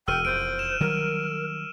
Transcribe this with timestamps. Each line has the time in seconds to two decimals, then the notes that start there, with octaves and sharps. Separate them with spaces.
0.08 E1 G5 E6 F6 D#7
0.25 E1 F2 C5 D7
0.59 E7
0.80 D#3 F#3 G3 A#4